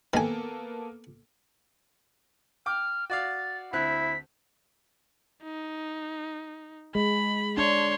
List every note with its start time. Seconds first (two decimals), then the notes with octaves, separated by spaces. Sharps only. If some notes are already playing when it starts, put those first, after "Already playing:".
0.14 D#3 A#3 B3 A4 G#5
2.66 G5 D6 F6
3.10 F#4 D5 F5 A6
3.73 D2 C4 E4 F#6 B6
5.43 D#4
6.95 G#3 B5
7.57 D4 C#5 C6